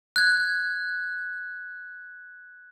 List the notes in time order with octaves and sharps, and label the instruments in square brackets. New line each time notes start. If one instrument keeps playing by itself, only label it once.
[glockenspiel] F#6 G#6